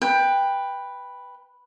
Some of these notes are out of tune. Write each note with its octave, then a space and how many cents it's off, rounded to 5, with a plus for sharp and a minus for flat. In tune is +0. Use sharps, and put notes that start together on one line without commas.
B4 +0 G5 +15